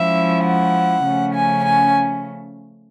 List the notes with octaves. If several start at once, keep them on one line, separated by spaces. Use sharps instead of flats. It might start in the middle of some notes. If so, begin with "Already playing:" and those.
Already playing: F3 G#3 C#4 E4 E5
F#5
C#3 F3 A3 C#4
G#5
G#5